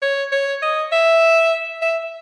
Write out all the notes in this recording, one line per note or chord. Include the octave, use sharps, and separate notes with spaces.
C#5
C#5
D#5
E5
E5